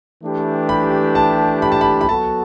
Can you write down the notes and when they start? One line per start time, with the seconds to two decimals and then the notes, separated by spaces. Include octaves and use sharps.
0.22 E3 A3 D4 G4 B4
0.69 B5
1.15 A5
1.62 B5
1.72 A5
1.81 B5
2.01 B5
2.09 F#3 B3 F#4 A4 A5